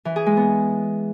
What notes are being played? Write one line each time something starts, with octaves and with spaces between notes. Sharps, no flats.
E3
G#4
G#3
B3